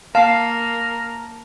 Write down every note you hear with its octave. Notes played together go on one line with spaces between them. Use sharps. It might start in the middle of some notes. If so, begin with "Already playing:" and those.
A#3 A#4 F5 A5